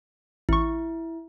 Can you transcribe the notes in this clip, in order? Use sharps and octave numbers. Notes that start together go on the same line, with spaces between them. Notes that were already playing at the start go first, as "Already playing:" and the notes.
A1 E4 C#6